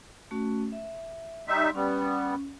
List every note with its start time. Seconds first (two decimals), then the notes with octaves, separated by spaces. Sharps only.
0.31 A3 C#4 F#4
0.72 E5
1.48 G3 D#4 E5 C6
1.75 G3 B3 C#4